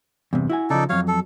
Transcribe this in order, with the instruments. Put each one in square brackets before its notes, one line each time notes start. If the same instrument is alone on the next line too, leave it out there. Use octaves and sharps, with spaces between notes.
[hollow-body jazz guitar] E2 G2 C3
E4 F#4 G#5
[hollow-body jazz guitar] C#3 F3 [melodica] D#4 A4 D5
[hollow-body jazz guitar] F2 F#3 [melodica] C#5 F5
[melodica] A4